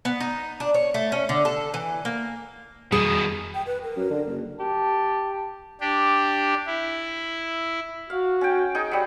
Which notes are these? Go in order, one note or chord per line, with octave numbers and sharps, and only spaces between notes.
B3
D#4
D4
C#5
A3
C#4
D3
A4
E3
A#3
F2 B2 D#3 F#3 G3 G#4 D#6
G5
B4
A#4
F#2
D3
F#1
G4 A5
D4 G4
E4
F#4 F5
C#4 G5
D#4 G#4
F#3 G3